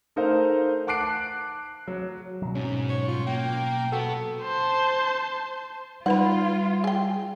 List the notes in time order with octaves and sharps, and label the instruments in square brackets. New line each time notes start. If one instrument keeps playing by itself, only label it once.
[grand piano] A3 D#4 A#4 C5 F5
F#5 A5 D6 F#6 C7 D7
F#3
[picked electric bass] B2 F#3
[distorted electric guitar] G#2 D#4 [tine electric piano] C#4
[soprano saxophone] C#5
F4
[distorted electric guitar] A#3 [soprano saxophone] G5
[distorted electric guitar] B3 [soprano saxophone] F#4 [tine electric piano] A4
[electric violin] C5 A5
[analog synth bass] G3 [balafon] D#4 B4 B5 [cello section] F4 [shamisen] F#5
[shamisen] G#4 G5